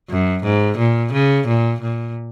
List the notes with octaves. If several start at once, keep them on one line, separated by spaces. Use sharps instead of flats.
F#2
G#2
A#2
C#3
A#2
A#2